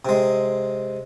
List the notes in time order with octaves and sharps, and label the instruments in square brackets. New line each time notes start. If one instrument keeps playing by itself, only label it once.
[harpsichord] C3 G#3